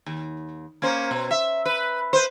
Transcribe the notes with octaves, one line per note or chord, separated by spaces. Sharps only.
D#2
A#3 C#4 C5
B2
E5
B4
B4 C5